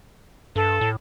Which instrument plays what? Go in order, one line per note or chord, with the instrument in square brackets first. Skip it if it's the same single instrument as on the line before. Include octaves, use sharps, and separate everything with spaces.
[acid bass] G2 [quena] A4
[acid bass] A2